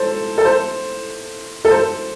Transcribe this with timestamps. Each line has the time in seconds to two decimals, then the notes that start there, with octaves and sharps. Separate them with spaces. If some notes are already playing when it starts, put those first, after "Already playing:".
Already playing: A4 C5
0.38 A4
0.45 C5
1.65 A4
1.70 C5